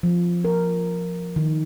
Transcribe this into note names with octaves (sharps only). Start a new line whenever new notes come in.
F3
A#4
D#3